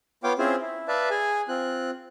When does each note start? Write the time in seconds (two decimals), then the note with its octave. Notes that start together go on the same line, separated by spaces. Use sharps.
0.24 B3 F4 C#5 F5 G5 D6
0.38 C4 C#4 E4 F4 G#4 C5
0.60 E4
0.88 B4 D5 E5 F5 A5
1.10 G#4 G#5
1.49 C4 F4 F#6